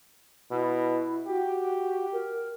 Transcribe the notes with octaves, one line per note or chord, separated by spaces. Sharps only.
B2 E4
F#4 G4
A#4